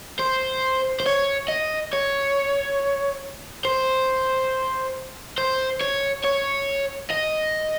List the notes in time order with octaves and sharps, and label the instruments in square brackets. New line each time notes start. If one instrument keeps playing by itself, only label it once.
[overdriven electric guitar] C5
C5
C#5
D#5
C#5
C5
C5
C#5
C#5
D#5